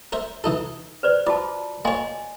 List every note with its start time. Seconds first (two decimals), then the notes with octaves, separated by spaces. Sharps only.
0.12 A#4 C5 E5
0.44 E3 D#4 A4
1.03 B4 C5 D5
1.27 F4 F#4 D5 A5
1.85 A#3 C#5 D#5 G#5 C6